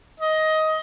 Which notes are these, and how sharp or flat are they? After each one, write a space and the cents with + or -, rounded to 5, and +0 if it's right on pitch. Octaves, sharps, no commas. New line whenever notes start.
D#5 +15